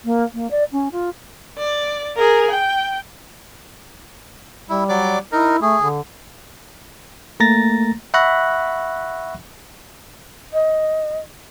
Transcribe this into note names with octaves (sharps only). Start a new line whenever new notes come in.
A#3
A#3
D5
C#4
F4
D5
G#4 A#4
G5
G3 E4
F#3 D5 D6
D#4 E4 A#4
A3 G#4
D3
A3 A#3 A#5 A6 A#6
E5 F#5 B5 C#6 F#6 A#6
D#5